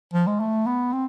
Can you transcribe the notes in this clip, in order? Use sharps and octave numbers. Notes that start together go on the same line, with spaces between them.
F3
G#3
A3
B3
C4